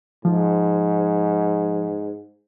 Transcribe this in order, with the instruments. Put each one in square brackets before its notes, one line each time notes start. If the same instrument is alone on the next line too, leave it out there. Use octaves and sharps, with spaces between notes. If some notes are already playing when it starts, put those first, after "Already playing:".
[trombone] G#2 [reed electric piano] F3